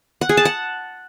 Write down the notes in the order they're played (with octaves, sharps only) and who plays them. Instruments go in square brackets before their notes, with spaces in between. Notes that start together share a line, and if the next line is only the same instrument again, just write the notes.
[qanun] F#5
G#4
A5
F#5